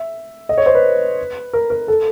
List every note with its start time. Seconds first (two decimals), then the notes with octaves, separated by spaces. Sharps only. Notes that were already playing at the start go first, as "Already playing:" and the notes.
Already playing: E5
0.49 D#5
0.58 C#5
0.66 C5
0.75 B4
1.53 A#4
1.70 A#4
1.88 A4